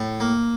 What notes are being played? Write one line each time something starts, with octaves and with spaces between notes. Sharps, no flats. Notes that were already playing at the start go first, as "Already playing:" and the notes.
Already playing: A2
A#3